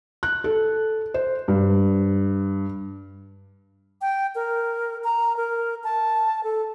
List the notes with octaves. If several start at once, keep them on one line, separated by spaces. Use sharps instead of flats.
F#6
A4
C5
G2
G5
A#4
A#5
A#4
A5
A4